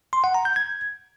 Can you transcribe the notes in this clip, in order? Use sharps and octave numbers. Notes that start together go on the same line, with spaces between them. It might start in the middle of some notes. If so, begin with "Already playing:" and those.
C6
F#5
A#5
G6
G#6